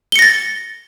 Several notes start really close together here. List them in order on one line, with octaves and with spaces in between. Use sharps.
G7 C#7 A#6 A6